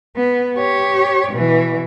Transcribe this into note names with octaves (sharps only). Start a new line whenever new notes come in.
B3
G4 C#5
B2 E3